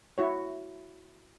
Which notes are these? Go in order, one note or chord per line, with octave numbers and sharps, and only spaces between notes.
E4 F#4 C#5